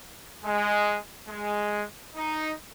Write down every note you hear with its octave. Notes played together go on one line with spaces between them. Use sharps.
G#3
G#3
D#4